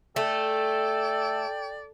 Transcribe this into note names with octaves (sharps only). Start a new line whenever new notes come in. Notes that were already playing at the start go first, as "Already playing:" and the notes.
A3 A4 D5 G5